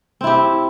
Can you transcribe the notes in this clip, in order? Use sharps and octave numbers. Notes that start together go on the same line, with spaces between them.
C4 E4 G4